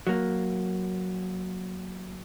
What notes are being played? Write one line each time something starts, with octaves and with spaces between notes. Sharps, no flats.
F#3 A#3